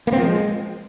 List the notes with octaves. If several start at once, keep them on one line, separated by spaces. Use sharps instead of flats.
A#3
C4
F3
G#3